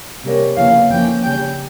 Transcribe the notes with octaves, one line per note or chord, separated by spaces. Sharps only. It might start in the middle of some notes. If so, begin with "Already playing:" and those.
C3 G3 A#3 C#4
E2 C#3 E3 A#3 C#4 F5
F2 E3 A#3 C#4 G5
C#3 G3 C#4 G5